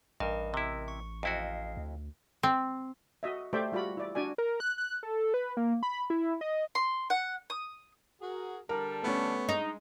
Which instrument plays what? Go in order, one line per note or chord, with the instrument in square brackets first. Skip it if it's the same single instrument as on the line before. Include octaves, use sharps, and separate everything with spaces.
[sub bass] A1 [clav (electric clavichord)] G2 [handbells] A#4 D#5
[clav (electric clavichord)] C3 E4
[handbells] C#6
[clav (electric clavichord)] F2 E4 F#4 [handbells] D#5 F5
[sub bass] D2
[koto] C4
[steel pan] F#4 D#5 E5
A3 G4 C5 D5 E5 G5
G3 F4 F#4 D5 B5
E4 D5
D4 F#4 D5 G#5
[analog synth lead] A#4
F#6
F#6
A4
B4
A#3
B5
E4
D#5
[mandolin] C6
F#5
D#6
[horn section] F#4 G#4 A#4
[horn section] D3 G3 A5 [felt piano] A#4
[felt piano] A3 C#4 [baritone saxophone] B3
[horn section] G#3 [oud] D#4